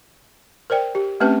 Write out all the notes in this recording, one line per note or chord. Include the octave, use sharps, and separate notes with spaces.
A#4 C5 D5 G5
G4
A3 C4 C#4 G4 B4 A5